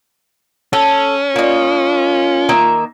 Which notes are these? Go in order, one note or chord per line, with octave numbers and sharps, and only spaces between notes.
C#4 A4
A#3 F4 D#5
D#3 A#3 E5